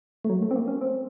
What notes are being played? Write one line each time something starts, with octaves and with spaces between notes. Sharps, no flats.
A3
F#3
A3
C4
A#3
C#4
C4